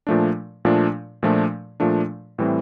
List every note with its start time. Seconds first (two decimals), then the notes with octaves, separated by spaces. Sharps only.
0.07 A#2 F3 A3 D4
0.65 A#2 F3 A3 D4
1.23 A#2 F3 A3 D4
1.80 A#2 F3 A3 D4
2.38 A2 E3 G3 C4